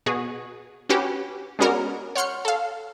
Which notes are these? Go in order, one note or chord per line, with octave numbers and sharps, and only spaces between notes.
B2 F#4 G#4
C#4 F#4 G4 B4
G#3 B3 C#4 F#4 A#4 D5
C#5 F#5 C6 F6 G6 C#7
A4 F5